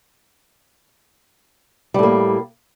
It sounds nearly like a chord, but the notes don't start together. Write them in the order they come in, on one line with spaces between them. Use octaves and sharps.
G3 A2 A#3